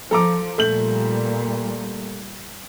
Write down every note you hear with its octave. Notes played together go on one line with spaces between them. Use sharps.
F3 A4 A#5 D6
A#2 G3 A3 G6 F#7